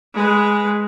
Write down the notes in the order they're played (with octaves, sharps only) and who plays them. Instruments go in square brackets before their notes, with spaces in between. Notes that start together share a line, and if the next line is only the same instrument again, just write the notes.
[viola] G#3 B4